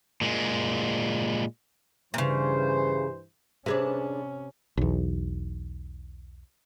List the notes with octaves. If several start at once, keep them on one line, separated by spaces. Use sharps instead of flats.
A#2 G#3
G2 A#2 C#3 E3 C5
C3 C#4 D4 G#4 B4
B1 E2